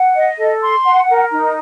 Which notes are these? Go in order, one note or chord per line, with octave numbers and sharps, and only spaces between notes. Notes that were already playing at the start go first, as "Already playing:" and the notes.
Already playing: F#5
D#5
A4
C6
F#5
A#4
D#4